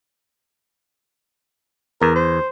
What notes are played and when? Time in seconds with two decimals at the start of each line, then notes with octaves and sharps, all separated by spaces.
2.02 E2 A#4
2.16 C5